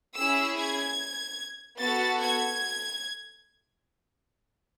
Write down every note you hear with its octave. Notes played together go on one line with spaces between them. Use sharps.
C#4 E4 G#4 E6
G#6
B3 F#4 A4 A6
G#6